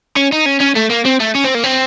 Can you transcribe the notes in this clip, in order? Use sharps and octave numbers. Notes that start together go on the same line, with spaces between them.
C#4
D#4
C#4
C#4
A3
A#3
C4
A3
C#4
C4
A#3
C4